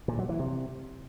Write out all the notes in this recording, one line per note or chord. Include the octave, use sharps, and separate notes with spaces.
A#2
F#3
E3
C3